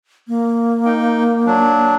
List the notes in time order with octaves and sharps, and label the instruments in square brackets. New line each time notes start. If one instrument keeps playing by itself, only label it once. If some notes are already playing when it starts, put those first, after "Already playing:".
[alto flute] A#3
[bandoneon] D#4 G5
F#3 D4